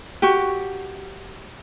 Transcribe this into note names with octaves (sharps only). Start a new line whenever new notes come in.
F#4 G4